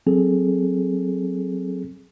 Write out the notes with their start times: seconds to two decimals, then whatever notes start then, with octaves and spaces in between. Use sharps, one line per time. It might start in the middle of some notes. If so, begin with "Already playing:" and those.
0.06 F#3 C4 G#4 A4